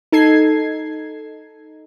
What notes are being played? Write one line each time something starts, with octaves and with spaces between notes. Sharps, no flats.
D#4 A4 G#6 C7